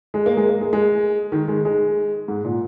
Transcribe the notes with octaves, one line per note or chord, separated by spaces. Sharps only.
G#3
A#3
G#3
A#3
G#3
G#3
D#3
G#3
G#3
G#2
A#2